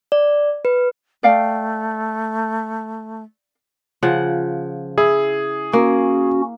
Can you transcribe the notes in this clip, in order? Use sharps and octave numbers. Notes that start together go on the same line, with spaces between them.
D5
B4
A3 D5 F5 G5
C#3 F3 F#5
E4 G#4
A#3 C#4 F#4